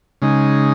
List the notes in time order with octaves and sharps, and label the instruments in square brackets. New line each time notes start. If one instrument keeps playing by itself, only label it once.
[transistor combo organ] C#3 G#3 D#4